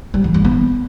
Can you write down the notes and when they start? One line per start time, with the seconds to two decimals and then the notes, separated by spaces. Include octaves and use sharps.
0.14 G3
0.24 E3
0.34 G2
0.45 B3